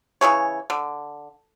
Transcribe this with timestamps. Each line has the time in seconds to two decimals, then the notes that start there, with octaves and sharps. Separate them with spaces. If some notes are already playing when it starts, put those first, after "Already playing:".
0.21 C#3 E3 G#4 C#5
0.70 D3